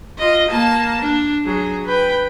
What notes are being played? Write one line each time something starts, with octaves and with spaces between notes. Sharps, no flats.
F4 D#5
A#3 A5
D4
F#3 G#4
B4 G5